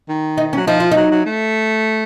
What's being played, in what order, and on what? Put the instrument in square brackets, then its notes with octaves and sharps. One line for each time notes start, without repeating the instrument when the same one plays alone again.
[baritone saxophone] D#3
[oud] D#4
C#4
[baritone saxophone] F#3
[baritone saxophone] F3 [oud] D#4
[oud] F4
[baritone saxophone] F#3 [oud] D#4
[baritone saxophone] F#3
A3